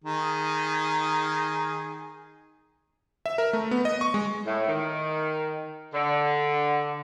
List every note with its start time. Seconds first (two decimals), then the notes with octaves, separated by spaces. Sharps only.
0.04 D#3 G#4
3.26 E5
3.38 A#4
3.53 A3
3.71 B3
3.85 D#5
4.01 C#6
4.14 G#3
4.46 A2
4.67 D#3
5.94 D3